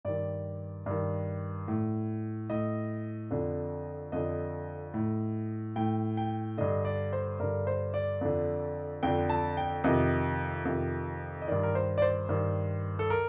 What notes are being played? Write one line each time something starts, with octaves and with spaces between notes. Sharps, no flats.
G2 D#3 D5
G2 D#3
A2
A2 D#5
F2 D3
F2 D3 D#5
A2
A2 G5
G5
G2 D3 D#5
D5
C5
G2 D3 A#4
C5
D5
F2 D3
F2 D3 G5
A5
G5
F2 C3 D#3 D#5
F2 C3 D#3
D#5
G2 D#3 D5
A#4
C5
D5
C5
G2 D#3
A4
A#4